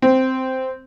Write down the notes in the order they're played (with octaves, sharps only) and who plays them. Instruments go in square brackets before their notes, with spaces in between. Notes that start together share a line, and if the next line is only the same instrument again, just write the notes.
[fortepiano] C4